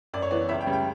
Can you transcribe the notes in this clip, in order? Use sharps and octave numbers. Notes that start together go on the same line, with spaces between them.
F#2 D5
C#5
E3 B3 D5
C#2 E5
G5
C#3 G3
G5